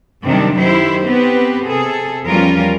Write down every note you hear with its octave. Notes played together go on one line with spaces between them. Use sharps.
F#2 C3 D#3 G3 A#3 D4
D#3 F#3 E4 G4 C5
B3 C4 G4 B4
C3 G#4 A4
E2 F3 G3 C#4 F4 A#4